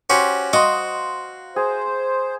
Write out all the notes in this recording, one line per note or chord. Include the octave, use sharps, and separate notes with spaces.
C#4 F#4 G4 C5 A#5
F#4 D#5 F5 C6
G#4 C5